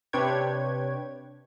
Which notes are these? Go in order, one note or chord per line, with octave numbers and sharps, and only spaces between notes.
C3 D4 B4 C#5 G5 G#6